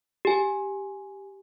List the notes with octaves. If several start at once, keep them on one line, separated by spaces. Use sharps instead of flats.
G4 G#5